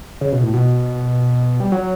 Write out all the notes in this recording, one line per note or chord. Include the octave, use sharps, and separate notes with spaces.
C#3
B2
A2
B2
G3
F#3